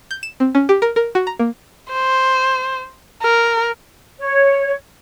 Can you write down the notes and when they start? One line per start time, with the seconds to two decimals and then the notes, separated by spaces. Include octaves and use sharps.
0.11 G6
0.23 E7
0.40 C4
0.55 C#4
0.69 G4
0.82 A#4
0.96 A#4
1.15 F#4
1.27 A#5
1.40 A#3
1.93 C5
3.22 A#4
4.18 C#5